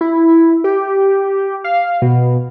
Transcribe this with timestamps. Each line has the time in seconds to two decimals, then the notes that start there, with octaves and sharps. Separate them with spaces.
0.01 E4
0.64 G4
1.64 F5
2.02 B2